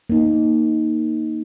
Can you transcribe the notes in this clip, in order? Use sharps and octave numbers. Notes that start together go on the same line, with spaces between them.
A#3 D#4